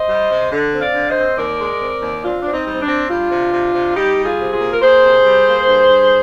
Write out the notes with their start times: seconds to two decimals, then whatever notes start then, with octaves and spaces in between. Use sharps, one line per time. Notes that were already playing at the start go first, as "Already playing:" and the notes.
Already playing: C5 D#5
0.09 G3
0.30 C3
0.52 D3
0.73 C4
0.81 D5 F5
0.95 D3
1.09 C5 D#5
1.16 C4
1.38 D#2 A#4 D5
1.60 G#3
1.81 C4
2.02 D#2
2.23 C4 D4 F4
2.41 C4 D4
2.53 C4 D#4
2.67 G3
2.73 C4
2.81 D4
2.89 C4
3.09 G3 D4 F4
3.31 C3
3.53 C3
3.74 C3
3.96 G3 D#4 G4
4.17 G3
4.24 F4 G#4
4.39 C3
4.53 F4 G#4
4.60 A#3
4.73 A#4
4.82 A#3 G#4 C5
5.04 C3
5.25 G3
5.46 A#3
5.68 G2
5.89 G2